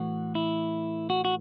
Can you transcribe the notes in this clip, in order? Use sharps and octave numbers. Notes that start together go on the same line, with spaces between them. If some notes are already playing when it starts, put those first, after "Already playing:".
Already playing: A2 E3 F#4
E4
F#4
F#4